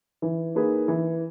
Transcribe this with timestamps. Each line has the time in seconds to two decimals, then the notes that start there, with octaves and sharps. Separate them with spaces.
0.22 E3
0.55 A#3 D#4 G#4 B4
0.88 E3